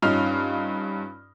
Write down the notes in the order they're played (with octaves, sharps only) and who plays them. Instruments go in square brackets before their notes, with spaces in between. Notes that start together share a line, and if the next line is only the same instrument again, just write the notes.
[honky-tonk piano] G2 C#4 D#4 F4 F5 F6